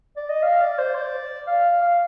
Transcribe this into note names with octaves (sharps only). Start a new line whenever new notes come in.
D5
D#5
F5
D5
C5
D5
F5
F5